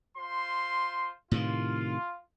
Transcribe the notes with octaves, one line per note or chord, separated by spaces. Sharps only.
F4 C5 C6
A2 C3 D#3 F4